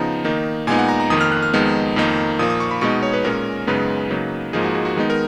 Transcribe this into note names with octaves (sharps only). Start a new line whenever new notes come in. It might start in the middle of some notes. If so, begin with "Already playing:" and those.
Already playing: C#3 F3 B3 D#4 A#5
D#3 A#3 D#4
A#2 G#3 B3 D#4 G#5
F#5
A#5
A#5
F2 D#3 A#3 D#6
F6
F#6
F6
F2 D#3 G#3 B3 D#4
F2 D#3 A#3 D#4
A#2 F3 A#3 D#6
D#6
C#6
B5
B2 G#3 B3 D#4 C#6
C#5
B4
A#2 G#3 C#4 A#4
F#2 C#3 G#3 B3 D#4 B4
C#3 F#3 A#3 D#4
G#2 F3 A#3 D#4 G#4
F#4
G#4
F#4
D#3 G#3 B3 D#4
A#4